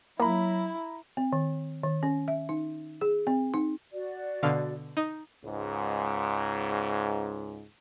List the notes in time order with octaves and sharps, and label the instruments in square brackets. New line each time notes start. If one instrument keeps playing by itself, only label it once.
[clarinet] F#3 [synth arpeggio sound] A#3 [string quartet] E4 [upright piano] A#5 B5
[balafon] C4
D#3
D#3
C#4
E5
D#4
G#4
C4
D#4
[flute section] F#4 D5
[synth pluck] B2 D3 F5
D#4
[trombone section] C#2 G#2